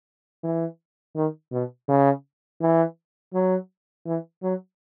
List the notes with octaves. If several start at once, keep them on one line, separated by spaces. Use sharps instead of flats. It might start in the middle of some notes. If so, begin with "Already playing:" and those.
E3
D#3
B2
C#3
E3
F#3
E3
F#3